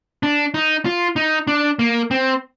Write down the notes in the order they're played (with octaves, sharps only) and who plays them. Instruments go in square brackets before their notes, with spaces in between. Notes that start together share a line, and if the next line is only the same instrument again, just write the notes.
[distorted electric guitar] D4
D#4
F4
D#4
D4
A#3
C4